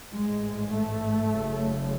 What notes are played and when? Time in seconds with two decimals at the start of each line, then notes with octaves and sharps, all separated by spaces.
0.13 A1 G#2 G#3
0.72 A3
1.31 F#1 F#2 C#3